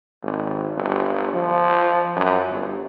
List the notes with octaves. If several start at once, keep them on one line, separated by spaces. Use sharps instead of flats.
G#1
G1
F3
F#2
G1